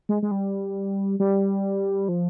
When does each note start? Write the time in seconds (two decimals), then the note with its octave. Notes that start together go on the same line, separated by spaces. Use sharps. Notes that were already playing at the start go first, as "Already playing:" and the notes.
0.09 G#3
0.23 G#3
0.31 G3
1.20 G3
2.08 F3